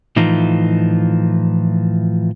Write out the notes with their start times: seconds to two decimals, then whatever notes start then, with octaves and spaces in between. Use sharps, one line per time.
0.16 A2 E3 F3 D#4 F4